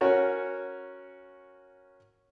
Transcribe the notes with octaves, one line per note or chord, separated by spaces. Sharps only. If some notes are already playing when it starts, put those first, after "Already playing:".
C#4 F#4 A#4 C#5